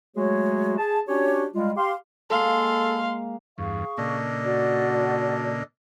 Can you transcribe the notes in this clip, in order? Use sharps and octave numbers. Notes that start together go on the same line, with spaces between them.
F#3 G#3 A3 F#4 G#4 C#5
G#4 A5
C#4 D4 F#4 G4 C#5
G3 G#3 F4
G4 F5 C6
G#3 A#3 A4 F5 C6
E2 G2 G#4 F5 C#6
A#2 C#3 A#3 D4 A4 D#5
F#4 D5